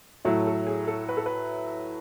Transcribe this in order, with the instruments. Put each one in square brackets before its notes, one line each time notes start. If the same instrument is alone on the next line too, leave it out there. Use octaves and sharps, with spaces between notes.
[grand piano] A2 F#3 A3 E4
[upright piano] A4
G#4
A4
B4
A4
B4